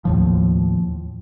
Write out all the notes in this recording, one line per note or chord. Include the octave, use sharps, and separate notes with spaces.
D#2 A2 F3